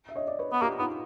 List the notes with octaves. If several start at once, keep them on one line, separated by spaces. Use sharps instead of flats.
E5
C#5 D#5
D5
B4 C#5
B3
A#3 F4 G4
B3 D#4 F4